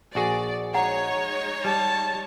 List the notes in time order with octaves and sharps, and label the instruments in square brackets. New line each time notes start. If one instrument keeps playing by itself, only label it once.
[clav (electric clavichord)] A#1 F#4 G#4 [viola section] D5
[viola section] G#3 D#4 C#5 [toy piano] F#5 A#5
[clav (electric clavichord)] G3 [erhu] A5